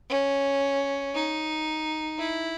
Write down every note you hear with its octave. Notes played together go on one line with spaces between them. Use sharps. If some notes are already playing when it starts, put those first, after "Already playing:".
C#4
D#4
E4